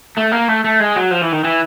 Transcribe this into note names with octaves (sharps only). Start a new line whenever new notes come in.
A3
A#3
A3
A3
G#3
F#3
F3
E3
D#3
E3